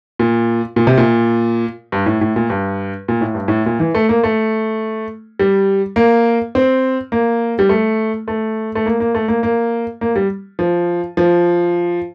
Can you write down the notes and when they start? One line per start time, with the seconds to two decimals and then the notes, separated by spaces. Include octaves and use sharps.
0.19 A#2
0.76 A#2
0.87 C3
0.97 A#2
1.92 G2
2.06 A2
2.21 A2
2.36 A#2
2.50 G2
3.08 A#2
3.21 A2
3.35 G2
3.48 A2
3.66 A#2
3.80 E3
3.94 A3
4.09 A#3
4.23 A3
5.39 G3
5.96 A#3
6.55 C4
7.12 A#3
7.59 G3
7.69 A3
8.28 A3
8.75 A3
8.86 A#3
9.00 A#3
9.15 A3
9.28 A#3
9.43 A#3
10.01 A#3
10.16 G3
10.59 F3
11.17 F3